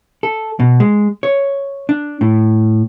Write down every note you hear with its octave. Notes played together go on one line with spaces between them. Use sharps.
A4
B2
G#3
C#5
D4
A2